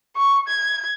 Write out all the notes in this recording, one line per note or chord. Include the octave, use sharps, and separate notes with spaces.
C#6
G#6